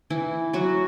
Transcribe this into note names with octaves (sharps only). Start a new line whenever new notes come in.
E3 E4
F#3 F#4